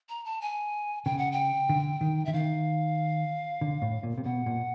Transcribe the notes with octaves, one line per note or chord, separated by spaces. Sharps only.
A#5
A5
G#5
C#3 G5
F#5
G5
D3
D#3
D3 E5
D#3 F5
D3
A2
A#2
C3
B2 F#5
A#2